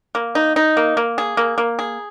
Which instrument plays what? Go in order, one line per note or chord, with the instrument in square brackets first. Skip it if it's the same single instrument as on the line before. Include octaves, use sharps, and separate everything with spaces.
[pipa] A#3
D#4
D#4
A#3
A#3
G#4
A#3
A#3
G#4